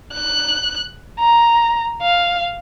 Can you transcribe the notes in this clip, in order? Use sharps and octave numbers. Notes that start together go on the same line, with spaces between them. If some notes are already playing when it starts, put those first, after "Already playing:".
F#6
A#5
F5